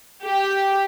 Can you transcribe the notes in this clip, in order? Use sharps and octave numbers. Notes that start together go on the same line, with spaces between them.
G4